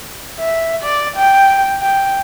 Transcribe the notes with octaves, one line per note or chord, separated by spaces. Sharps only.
E5
D5
G5
G5